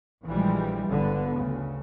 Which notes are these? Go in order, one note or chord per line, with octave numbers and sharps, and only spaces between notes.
A#1 E3 F3 G3 G#3
G1 D3 B3
D2 C#3